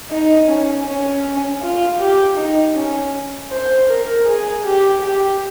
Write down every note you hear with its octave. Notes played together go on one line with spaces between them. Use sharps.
D#4
C#4
C#4
F4
G4
D#4
C#4
C5
A#4
G#4
G4
G4